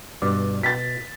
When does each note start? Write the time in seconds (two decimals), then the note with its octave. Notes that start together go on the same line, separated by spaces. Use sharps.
0.22 G2 B2 D5
0.63 B2 A6 B6